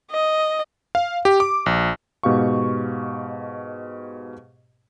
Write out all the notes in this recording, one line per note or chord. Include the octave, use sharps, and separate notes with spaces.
D#5
F5
G4
D6
A#1
G#2 B2 G4 F5 C#6